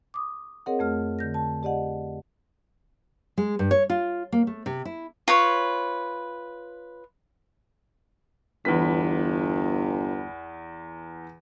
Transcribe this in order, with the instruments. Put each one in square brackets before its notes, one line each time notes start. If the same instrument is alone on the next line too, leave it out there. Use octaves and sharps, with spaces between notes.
[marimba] D6 D#6
C4 G#4 A#4 C#5 D#5 F#5
F2 A3 F6
D3 G6 A#6
A5
G4 D5 D#5 F#5
[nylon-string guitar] G#3
G2
C#5
F4
A#3
A3
C3
E4
[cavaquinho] F4 B4 C#5
[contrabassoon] G1 [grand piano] E2 B4 B6